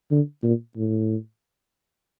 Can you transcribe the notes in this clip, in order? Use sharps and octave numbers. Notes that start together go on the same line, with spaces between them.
D3
A#2
A2